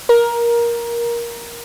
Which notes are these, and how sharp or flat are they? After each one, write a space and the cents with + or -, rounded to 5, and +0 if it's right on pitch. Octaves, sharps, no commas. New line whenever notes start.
A#4 +15